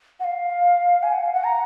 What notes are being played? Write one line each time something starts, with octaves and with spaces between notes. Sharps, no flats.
F#5
F5
G#5
F#5
F5
F#5
A#5